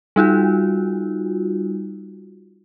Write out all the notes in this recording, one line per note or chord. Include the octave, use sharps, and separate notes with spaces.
G3 D#4 F4 F#4